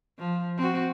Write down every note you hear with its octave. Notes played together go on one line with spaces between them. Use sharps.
F3
C4 F#4